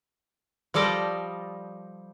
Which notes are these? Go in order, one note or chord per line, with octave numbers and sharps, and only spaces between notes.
F3 G3 A4 D5 D#5